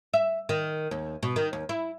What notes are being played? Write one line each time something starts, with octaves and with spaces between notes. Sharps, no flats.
E5
D#3
D#2
B2
D#3
D#2
E4